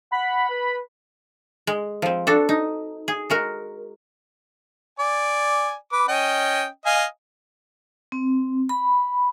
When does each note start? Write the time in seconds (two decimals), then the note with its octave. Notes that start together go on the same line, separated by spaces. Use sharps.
0.12 F#5 B5
0.49 B4
1.67 G#3
2.02 F3 C4
2.27 D4 F#4 A4
2.49 D#4
3.08 G#4
3.30 G#3 F#4 A#4
4.99 D5 G#5
5.92 B4 D6
6.08 C#4 D#5 G5
6.86 D#5 F5 G#5
8.12 C4
8.69 B5